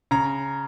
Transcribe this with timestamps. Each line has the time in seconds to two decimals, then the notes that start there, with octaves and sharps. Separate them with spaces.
0.11 C#3 A#5